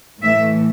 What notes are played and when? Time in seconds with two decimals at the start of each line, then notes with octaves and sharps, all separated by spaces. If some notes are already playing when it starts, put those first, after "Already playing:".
0.22 A2 E3 A3 E5